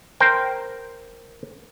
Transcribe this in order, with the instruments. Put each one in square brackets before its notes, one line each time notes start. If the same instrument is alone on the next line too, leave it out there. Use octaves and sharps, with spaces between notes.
[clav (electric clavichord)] A#4 C5 G5